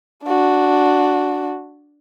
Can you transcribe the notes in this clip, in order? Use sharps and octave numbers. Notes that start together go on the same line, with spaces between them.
D4 F#4